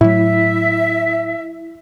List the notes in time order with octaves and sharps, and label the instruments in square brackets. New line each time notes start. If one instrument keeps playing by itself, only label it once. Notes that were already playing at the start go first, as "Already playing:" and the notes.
[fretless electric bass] A2 F#3 [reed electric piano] E4 [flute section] E5